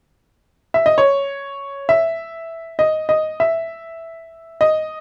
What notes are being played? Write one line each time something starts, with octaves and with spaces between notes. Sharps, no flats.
E5
D#5
C#5
E5
D#5
D#5
E5
D#5